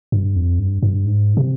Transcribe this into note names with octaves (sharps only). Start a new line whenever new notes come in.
G2
F2
G2
G2
G#2
C3